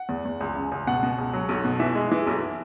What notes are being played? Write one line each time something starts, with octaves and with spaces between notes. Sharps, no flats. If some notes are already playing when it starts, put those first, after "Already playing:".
Already playing: F#5
E2
E2
C#2
C#3
C#2
B2 F#5
B2
C#2
F#3
B1
B2
E3 E5
G#3
E3
B1